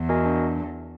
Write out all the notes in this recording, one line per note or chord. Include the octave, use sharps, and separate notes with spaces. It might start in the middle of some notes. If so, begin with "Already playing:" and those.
Already playing: E2
F#4 A#4 D#5 G#5
D4